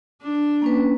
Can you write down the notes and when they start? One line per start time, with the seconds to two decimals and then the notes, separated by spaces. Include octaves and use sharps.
0.23 D4
0.62 A#3 C#4 B4